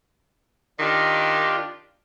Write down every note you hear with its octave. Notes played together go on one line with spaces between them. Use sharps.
D#3 D4 F4 G4